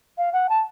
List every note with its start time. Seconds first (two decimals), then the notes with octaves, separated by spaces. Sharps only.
0.18 F5
0.33 F#5
0.49 A5